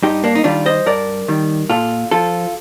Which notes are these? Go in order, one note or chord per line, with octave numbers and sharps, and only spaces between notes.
G2 D#4 G4
A#3 D4
D#4
D#3 G3 D4 F4
C5 D#5
G2 A#4 D5
D#3 G3
A#2 F4 A4
F3 F4 A4